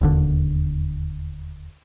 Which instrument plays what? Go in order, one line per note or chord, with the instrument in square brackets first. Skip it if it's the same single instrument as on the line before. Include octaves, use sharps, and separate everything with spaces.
[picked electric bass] E1 D#2 D3